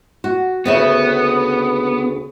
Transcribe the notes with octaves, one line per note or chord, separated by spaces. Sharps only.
F#4
D2 C#3 B3 E5